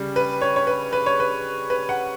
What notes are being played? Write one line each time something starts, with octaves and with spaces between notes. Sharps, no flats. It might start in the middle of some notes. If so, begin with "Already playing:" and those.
Already playing: C#3 G3
B4
C#5
C#5
B4
B4
C#5
B4
B4
F#5